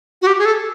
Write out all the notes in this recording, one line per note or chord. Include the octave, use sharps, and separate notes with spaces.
F#4
G4
G#4
A4